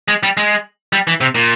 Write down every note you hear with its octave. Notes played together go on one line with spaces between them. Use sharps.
G#3
G3
G#3
G3
E3
C3
A#2